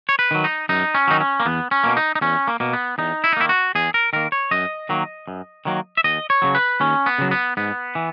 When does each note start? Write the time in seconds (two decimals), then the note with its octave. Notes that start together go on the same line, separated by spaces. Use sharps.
0.09 C#5
0.19 B4
0.31 D#3 F#3
0.44 D#4
0.69 F#2 D#4
0.94 C#4
1.08 D#3 F#3 D#4
1.20 C#4
1.40 A#3
1.45 E2 B3
1.71 C#4
1.84 B2 A#3
1.97 D#4
2.15 D#4
2.21 E2 C#4
2.48 A#3
2.60 B2 A#3
2.73 B3
2.98 E2 D#4
3.24 E4
3.33 D#4
3.37 D#3 A#3 E4
3.49 F#4
3.75 E2 G#4
3.94 A#4
4.13 D#3 A#3 A#4
4.32 C#5
4.51 F#2 D#5
4.89 D#3 F#3 A#3
5.28 F#2
5.65 D#3 F#3 A#3
5.97 E5
6.04 D#2 D#5
6.30 C#5
6.42 C#3 F#3
6.55 B4
6.80 D#2 C#4
7.06 B3
7.18 C#3 F#3
7.31 B3
7.57 G#2 B3
7.95 E3